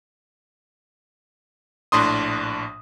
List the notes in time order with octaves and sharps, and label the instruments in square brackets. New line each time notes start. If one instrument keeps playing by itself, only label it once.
[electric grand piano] A#1 A2 D4 C6 D#6